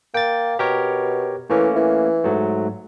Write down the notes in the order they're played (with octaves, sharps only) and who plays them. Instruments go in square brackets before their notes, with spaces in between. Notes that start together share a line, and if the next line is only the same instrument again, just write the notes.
[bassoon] A#3 [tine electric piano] G5 A6
[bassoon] B2 [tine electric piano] G4 A#4 C#5
[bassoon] E3 [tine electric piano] A3 A#3 C#4
[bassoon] E3
[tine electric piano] G#2 F#3 A3